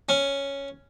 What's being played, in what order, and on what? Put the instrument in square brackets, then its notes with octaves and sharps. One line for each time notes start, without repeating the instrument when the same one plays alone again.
[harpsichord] C#4